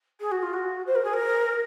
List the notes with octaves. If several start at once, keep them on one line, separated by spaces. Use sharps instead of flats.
G#4
F#4
F4
F#4
C5
A#4
G#4
A#4